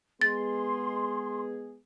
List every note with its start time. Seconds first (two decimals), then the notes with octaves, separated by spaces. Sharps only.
0.21 G#3 B3 G#4 C6 A6